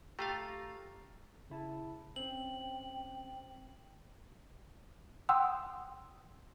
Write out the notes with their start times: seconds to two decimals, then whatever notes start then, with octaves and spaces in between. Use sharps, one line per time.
0.19 A3 F4 G4 F5 A#5
1.50 C#3 E4 A5
2.16 C4 C#4 G5 F#7
5.29 F#5 G5 C6 D#6 E6